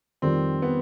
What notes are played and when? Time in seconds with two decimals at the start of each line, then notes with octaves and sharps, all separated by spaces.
0.22 F2 D#3 G3 C4
0.62 B3